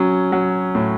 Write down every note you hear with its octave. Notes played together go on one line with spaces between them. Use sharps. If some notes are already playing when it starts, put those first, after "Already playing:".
Already playing: F#3 C#4
F#3
A2